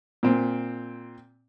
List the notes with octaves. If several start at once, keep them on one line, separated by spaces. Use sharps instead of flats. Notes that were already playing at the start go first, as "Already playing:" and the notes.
A#2 C4